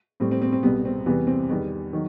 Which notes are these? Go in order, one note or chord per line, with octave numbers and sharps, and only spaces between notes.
A2 G3 C4
C4
C4
C4
C2 B2 G3 B3
C4
E2 C3 E3 G3 B3
C4
E2 D#3 G3 B3
D#3 F#3